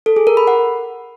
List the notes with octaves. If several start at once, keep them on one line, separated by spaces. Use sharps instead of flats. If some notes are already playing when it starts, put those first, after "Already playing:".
A4
G#4
A#4
B5
F#5